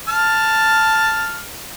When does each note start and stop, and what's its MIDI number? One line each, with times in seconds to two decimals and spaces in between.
0.08 1.41 81
0.08 1.41 89